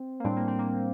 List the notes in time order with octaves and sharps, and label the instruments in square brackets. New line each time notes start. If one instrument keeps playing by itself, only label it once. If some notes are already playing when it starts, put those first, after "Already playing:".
Already playing: [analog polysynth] C4
A#3
[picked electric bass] A2 G3 D4 [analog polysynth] C4
[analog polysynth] A#3
C4
A#3